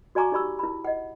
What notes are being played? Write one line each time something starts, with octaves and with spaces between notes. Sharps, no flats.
F#4 D5 G#5 A#5 C#6 D6
D#4 G4 D5 B5 C#6 E6
E4 B5
D#5 F#5